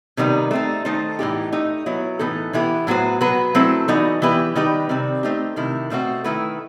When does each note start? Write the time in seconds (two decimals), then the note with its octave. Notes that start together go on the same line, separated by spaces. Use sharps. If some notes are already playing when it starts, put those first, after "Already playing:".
0.17 C3 D#3 G3 B3 D#4
0.51 A3 C4 D#4
0.85 D#3 A3 D#4 A4 C5
1.19 A2 E3 B3 D#4 G4
1.52 A3 D#4 G4
1.86 F#3 B3 E4
2.19 A2 E3 B3 D#4 A4
2.53 E3 B3 E4 G4
2.87 A2 F#3 B3 F#4 C5
3.21 F#3 B3 F#4 B4
3.55 F#3 A3 C4 E4 A4
3.88 E3 G3 B3 D#4 F#4
4.22 E3 B3 E4 G4 B4
4.55 D#3 G3 D#4 G4 B4
4.89 C3 D#3 G3 C4
5.23 A3 C4 D#4 G4
5.56 C3 D#3 A3 E4
5.90 B2 A3 C4 D#4 F#4
6.24 D#3 A3 E4 B4